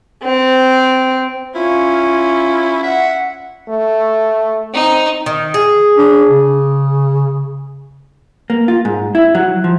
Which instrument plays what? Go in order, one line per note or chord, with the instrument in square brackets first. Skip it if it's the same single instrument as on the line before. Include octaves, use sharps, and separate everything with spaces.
[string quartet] C4
[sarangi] C#4 [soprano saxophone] E4 [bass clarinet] F4
[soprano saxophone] E5 [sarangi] F#5
[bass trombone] A3
[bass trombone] C4 [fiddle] D#4
[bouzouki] D#3
G#4
[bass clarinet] D4
C#3
[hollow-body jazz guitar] A#3
F4
G#2
E4
F#3
F3